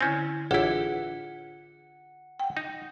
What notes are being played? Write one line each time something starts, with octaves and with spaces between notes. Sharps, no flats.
D3 C4 C#4 E4 G#5
A1 D4 E4 F4 G#4 F#5
F#5 G5
D#4